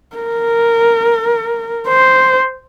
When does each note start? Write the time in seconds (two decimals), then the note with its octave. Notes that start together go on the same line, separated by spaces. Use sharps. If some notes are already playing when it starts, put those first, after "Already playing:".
0.16 A#4
1.88 C5